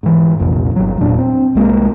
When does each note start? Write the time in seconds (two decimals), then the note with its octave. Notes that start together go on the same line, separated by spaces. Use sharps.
0.03 G#2 E3
0.39 F1 C2 F2 A#2
0.76 G1 F#3
1.01 E1 A#2 D4
1.19 C4
1.55 C2 G#3 A#3